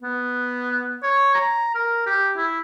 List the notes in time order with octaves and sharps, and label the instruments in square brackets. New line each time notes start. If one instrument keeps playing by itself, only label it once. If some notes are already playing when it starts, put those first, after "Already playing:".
[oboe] B3
C#5
A#5
A#4
G4
E4